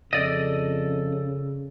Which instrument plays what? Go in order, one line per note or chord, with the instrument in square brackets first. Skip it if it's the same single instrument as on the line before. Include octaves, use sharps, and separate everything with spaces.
[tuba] F2 [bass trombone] C#3 [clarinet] A4 [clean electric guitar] D5 D#5